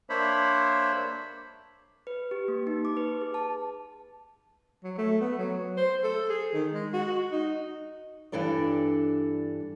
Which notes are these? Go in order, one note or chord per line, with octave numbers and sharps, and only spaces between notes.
A#3 D4 C5 C#5 E5 B5
B4
G4
A#3
D#4
D6
B4
G#4
A5
F#3
A3
B3
F#3
C5
A4
G#4
D#3
G#3
F#4
D#4
G2 E3 D4 A4 D5